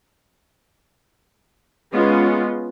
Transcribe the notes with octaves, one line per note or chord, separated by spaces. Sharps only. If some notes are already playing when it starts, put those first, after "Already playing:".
G#3 B3 C#4 F4